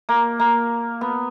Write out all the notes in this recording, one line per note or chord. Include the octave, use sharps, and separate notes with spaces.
A#3
A#3
B3